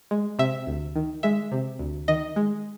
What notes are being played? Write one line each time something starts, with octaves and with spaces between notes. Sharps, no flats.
G#3
C3 E5
D2
D#3
G#3 E5
C3
D2
D#3 D#5
G#3